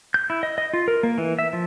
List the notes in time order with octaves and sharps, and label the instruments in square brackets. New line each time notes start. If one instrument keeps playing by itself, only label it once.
[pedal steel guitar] G6
E4
D#5
D#5
F4
A#4
A#3
E3
E5
F3